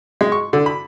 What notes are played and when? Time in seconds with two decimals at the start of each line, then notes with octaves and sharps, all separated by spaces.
0.21 G#3
0.32 C#6
0.53 D3
0.66 B5